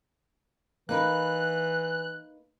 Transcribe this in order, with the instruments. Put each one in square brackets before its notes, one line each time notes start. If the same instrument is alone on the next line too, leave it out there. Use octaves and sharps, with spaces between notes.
[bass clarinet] E3 [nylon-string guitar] A#3 D#4 B4 [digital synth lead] F#6